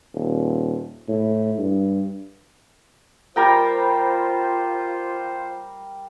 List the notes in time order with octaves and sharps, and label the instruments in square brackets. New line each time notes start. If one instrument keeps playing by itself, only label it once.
[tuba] D#1
A2
G2
[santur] G3 A#4 G5 [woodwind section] F4 C5